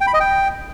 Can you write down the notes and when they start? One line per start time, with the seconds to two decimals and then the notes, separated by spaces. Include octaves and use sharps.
0.01 G5
0.07 B5
0.14 D#5
0.20 G5